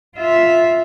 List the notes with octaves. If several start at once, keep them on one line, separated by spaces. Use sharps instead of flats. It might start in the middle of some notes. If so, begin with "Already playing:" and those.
F4 E5